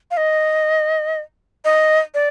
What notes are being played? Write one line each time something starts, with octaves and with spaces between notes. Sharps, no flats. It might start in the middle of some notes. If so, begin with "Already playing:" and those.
F5
D#5
D#5
D5